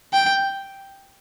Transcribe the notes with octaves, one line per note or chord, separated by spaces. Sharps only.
G5